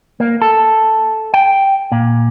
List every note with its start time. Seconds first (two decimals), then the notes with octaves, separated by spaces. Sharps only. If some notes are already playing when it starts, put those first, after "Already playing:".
0.20 A#3
0.42 A4
1.34 G5
1.92 A#2